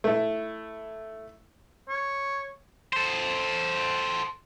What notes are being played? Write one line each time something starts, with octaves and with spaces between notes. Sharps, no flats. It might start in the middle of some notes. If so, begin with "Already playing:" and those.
A3 E4
C#5
A4 C5